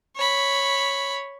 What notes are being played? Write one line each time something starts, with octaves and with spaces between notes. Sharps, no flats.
C#5 B5